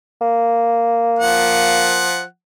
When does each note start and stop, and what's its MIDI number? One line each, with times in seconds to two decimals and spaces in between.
0.21 2.09 58
1.19 2.23 53
1.19 2.23 78